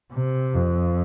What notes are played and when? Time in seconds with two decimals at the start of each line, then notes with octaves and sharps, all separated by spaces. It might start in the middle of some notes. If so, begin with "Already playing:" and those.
0.12 C3
0.54 F2